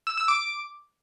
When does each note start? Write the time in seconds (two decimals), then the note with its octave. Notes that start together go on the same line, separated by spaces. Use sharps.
0.07 E6
0.17 E6
0.28 D6